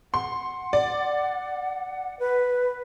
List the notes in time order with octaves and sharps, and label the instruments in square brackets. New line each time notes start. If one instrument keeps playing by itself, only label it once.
[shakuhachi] F#5 [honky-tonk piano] C6
[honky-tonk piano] D5
[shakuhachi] B4